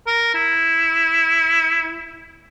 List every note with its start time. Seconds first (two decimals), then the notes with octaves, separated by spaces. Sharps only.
0.07 A#4
0.35 E4